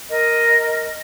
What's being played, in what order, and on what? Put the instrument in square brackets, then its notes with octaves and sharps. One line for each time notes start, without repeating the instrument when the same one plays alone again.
[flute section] A#4 D#5